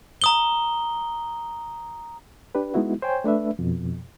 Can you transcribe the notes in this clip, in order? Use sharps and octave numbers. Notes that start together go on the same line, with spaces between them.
A#5 D#6 G7
D4 G4 B4
G#3 B3 D#4 E4 F#4
C5 C#5 G5 G#5
A3 D4 B4 E5
F2 B2